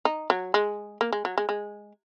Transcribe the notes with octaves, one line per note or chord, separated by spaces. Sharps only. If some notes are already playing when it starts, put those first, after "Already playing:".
D#4
F#3
G#3
A#3
G#3
F#3
G#3
G#3